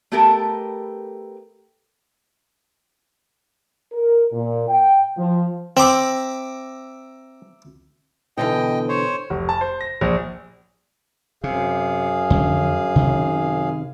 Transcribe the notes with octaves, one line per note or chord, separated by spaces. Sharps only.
A3 B3 G4 A4 A#4
A#4
A#2
G5
F3
C4 E5 A#5 D6
B2 D3 E3 D#5 G5
C5 C#5
F1
A5
C5
A#6
A#1
F#2 C3 G#4 F5
F2 D3 C#4
C3 D#3 C#4